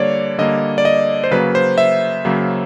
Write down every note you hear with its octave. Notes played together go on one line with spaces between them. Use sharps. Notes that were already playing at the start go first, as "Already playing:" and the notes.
Already playing: D3 G3 A#3 C#5 D5
D3 G3 A#3 D#5
D5
D#5
C5
C#3 F#3 A#3 B4
C5
E5
C#3 F#3 A#3